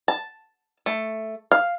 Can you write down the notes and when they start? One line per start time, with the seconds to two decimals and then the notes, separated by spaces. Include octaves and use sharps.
0.08 A5
0.86 A3
1.52 F5